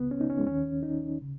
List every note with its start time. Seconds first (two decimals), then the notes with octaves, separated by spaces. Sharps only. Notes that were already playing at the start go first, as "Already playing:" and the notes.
Already playing: C#2 C#3 B3
0.11 C#4
0.21 D#4
0.30 C#4
0.39 G#3
0.46 D#2 D#3 C#4
0.83 D#4
1.22 C#3